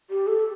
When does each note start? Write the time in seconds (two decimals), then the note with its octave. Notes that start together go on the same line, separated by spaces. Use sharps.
0.10 G4
0.27 A4